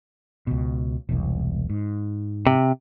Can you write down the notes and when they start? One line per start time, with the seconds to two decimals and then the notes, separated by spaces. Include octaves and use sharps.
0.47 C#2 B2
1.09 E1 C2
1.70 G#2
2.47 C3